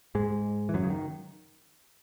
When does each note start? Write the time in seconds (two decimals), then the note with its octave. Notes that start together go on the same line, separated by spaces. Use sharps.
0.15 G#2 G#3
0.69 E3
0.74 F#2 F#3
0.83 C#3
0.90 D#3